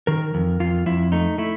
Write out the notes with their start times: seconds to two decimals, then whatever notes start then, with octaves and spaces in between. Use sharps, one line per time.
0.07 D#3 A#4
0.34 F2
0.60 F2 F4
0.86 F2 E4
1.12 A3 D#4
1.38 A3 E4